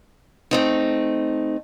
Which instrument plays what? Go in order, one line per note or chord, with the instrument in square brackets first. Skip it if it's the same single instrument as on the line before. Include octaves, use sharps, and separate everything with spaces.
[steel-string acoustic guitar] A3 C4 D#4